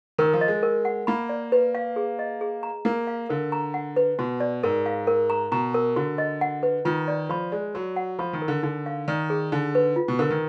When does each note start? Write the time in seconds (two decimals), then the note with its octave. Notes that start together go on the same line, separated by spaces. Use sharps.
0.18 D#3 A#4
0.33 F3
0.41 D#5
0.48 G#3
0.63 A#4
0.85 F#5
1.07 A#3 B5
1.29 D5
1.52 B4
1.75 F5
1.96 G#4
2.19 D#5
2.41 G#4
2.63 A#5
2.85 A#3 A#4
3.07 F5
3.29 D3 A#4
3.52 A#5
3.74 F#5
3.96 B4
4.19 B2 F#4
4.40 D5
4.63 G#2 A#4
4.86 F5
5.07 A#4
5.30 A#5
5.52 B2 A#5
5.74 A#4
5.96 D3 F#4
6.18 D#5
6.41 F#5
6.63 B4
6.85 D#3 F4
7.08 D5
7.29 F3 B5
7.52 G#3 D5
7.75 F#3 F#4
7.96 F#5
8.19 F3 B5
8.33 D#3
8.42 A#4
8.48 D3
8.63 D3 D#4
8.86 F5
9.08 D#3 D5
9.30 G#4
9.52 D3 D#4
9.75 B4
9.96 F4
10.08 B2
10.19 D3 A#4
10.30 D#3